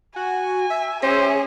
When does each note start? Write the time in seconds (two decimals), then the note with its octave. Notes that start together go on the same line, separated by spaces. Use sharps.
0.16 F#4 G#5
0.70 E5
1.03 C#4 G#4 C5